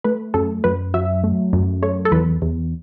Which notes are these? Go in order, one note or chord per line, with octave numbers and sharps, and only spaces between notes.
A3 B4
F#2 A4
F#2 B4
F#3 E5
A3
F#2
A3 C#5
A4
E2 B4
E2